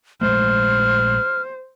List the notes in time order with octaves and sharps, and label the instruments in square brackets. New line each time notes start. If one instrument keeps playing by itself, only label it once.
[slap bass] A#1 G#3 A3 [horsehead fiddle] C5 [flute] F6